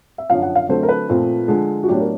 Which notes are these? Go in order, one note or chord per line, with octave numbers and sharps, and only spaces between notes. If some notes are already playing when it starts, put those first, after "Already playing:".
E5
F#2 D3 F3 F5
F#5
F5
D3 F#3 A3 C4 C5
A#4
B4
A#2 F3 A3 C4
D3 F3 G#3
F#4
A2 F#3 B3 D4 G4
A#4